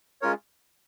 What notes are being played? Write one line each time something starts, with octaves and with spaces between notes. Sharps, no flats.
G#3 C#4 F4 A#4 C#5